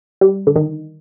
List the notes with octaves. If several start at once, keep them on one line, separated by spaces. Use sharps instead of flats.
G3
D3
D#3